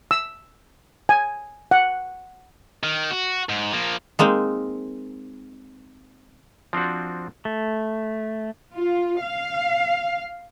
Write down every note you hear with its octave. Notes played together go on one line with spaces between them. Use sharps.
E6
G#5
F#5
D#3
F#4
G#2
F3 A#3
G#3 A#3 C4 D#4
F3 C4 D4 F#4
A3
F4
F5